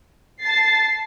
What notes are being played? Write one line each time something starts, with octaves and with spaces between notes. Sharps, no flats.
A5 A6 C7